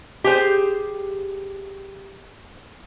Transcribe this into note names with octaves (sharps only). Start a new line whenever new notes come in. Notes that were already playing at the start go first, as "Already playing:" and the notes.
G4 G#4 C5